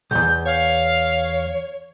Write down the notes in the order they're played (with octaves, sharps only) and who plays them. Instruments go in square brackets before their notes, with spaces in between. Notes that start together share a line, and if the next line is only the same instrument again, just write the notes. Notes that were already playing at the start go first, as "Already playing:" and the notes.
[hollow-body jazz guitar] B1 E2 [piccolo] G6
[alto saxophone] C#5 [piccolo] F5